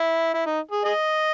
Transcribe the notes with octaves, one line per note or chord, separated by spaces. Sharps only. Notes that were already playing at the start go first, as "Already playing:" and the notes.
Already playing: E4
E4
D#4
G#4
G#4 D#5